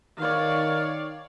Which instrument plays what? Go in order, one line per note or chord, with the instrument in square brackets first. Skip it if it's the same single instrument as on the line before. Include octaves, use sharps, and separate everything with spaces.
[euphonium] D#3 [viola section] C#5 D5 F5